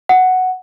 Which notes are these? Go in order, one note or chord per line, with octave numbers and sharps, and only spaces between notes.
F#5